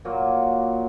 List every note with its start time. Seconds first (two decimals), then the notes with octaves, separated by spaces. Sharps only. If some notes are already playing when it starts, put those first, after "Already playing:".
0.05 A#2 F#3 A#3